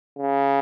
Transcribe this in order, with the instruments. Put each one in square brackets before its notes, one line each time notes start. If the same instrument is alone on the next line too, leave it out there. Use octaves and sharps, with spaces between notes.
[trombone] C#3